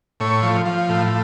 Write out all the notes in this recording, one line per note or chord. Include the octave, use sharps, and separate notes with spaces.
A2 C#5
F3
F3
A2